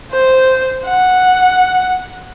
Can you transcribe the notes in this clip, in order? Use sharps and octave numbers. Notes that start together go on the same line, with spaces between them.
C5
F#5